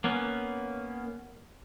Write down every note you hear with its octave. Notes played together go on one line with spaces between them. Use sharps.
A#3 B3 C#4